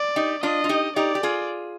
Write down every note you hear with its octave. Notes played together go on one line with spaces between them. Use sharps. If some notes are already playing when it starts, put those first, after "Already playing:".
Already playing: D5
D#4 G4
D4 F4 D#5
F4
D#4 G4
D#4 G4 D5
G4
F4 G#4